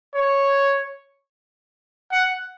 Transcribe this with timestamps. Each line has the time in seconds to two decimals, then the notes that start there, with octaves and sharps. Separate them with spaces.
0.15 C#5
2.12 F#5